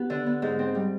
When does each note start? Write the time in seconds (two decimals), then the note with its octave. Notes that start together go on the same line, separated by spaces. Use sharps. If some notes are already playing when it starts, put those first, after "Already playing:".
Already playing: B3 G4
0.10 D3
0.26 B3
0.42 G#2
0.59 C4
0.75 G3